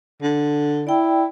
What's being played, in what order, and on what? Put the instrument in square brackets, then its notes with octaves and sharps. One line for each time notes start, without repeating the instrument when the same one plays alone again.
[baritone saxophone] D3
[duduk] E4 [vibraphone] D5 G5